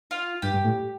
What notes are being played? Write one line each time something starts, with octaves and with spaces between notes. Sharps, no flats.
F4
G2 G4
G2
A2